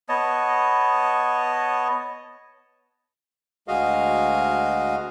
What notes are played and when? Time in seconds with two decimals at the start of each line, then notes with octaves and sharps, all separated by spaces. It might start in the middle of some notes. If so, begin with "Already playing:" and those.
0.09 B3 C#5 D#5 A5
3.68 D2 G#3 F#4 D#5 F5